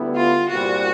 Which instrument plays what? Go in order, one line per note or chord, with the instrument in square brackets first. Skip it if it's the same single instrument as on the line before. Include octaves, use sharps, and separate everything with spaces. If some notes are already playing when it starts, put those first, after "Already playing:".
Already playing: [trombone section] D2 D3 G3 B3 E4
[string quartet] F4
[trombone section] C2 A#2 G3 C4 [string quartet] F#4